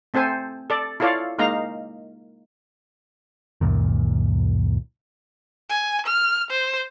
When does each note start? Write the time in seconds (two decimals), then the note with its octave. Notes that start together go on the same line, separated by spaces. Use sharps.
0.14 A3 C4 A4 C5 G#5
0.70 A4 D5
1.00 E4 F4 A4 C#5 D5 F5
1.39 G#3 A#3 D#4 F5 A#5
3.61 C#2 F#2 A#2 D#3
5.70 G#5
6.06 F6
6.51 C5